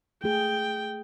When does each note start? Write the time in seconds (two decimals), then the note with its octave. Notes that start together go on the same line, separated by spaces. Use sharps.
0.24 A3 G#4 G5